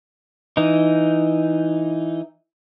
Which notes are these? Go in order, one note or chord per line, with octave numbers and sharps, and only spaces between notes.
E3 D#4